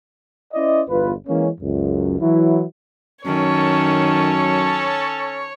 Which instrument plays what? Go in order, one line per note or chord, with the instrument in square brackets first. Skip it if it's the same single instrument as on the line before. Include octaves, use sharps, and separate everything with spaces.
[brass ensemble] C#4 E4 C5 D5 D#5
G1 E2 F4 B4
E3 G#3 A#3 C#4
C#2 F#2
E3 F#3 E4
[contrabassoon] F#2 [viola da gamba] D#3 [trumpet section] C#4 A4 A5 [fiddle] C#5